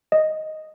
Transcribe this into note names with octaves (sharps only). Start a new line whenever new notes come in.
D#5